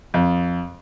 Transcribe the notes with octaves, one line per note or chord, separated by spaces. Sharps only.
F2